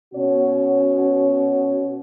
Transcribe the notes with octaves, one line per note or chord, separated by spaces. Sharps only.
B2 C#4 F#4 C#5